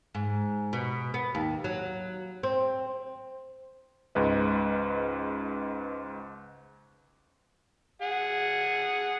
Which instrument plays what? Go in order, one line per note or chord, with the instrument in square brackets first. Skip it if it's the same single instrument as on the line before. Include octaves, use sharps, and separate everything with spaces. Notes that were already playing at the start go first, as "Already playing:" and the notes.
[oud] G#2
B2
B3
D#2
F#3
C4
[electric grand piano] C#2 G#2 B4 D#5
[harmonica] G#4 F#5